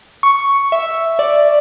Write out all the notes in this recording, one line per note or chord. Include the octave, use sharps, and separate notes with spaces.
C#6
E5
D5